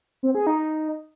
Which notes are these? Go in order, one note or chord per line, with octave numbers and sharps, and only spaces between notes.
C4
G#4
D#4